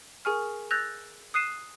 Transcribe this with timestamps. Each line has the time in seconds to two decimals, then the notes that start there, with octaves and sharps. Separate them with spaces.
0.25 G#4 A#4 G#5 C#6 F6
0.71 E6 F#6 G6 A6 A#6 F7
1.34 D#6 F#6 C7 D#7 E7